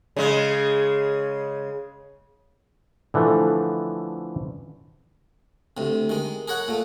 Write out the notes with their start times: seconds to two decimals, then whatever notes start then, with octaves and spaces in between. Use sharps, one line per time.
0.17 C#3 G#3
3.14 D3 E3 F3 A3
5.77 D2 C3
6.09 D#3 G#3
6.48 G#4 A#4 C#5 F#5
6.68 A#2 A3